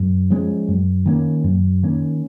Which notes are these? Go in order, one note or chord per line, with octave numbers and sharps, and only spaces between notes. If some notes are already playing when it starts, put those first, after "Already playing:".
Already playing: F#2
F3 G#3 C#4
F#2
D#3 A#3 C#4
F#2
D#3 A#3 C#4